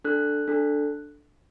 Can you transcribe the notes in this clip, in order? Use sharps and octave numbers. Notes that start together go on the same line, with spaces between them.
D4 A4 F#6
D4 A4